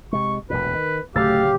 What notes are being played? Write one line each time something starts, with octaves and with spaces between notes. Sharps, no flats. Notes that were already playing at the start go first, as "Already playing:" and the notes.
C3 G#3 C#6
E1 D2 A#2 B4
D#3
D1 C#3 F#3 A3 G4 F5 E6 A6